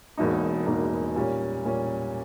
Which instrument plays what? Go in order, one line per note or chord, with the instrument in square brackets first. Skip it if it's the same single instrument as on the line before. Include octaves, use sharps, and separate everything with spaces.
[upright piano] E1 E2 B2 A#3 D#4
E1 E2 B2 A#3 D#4
A#2 G3 C#4
A#2 G3 C#4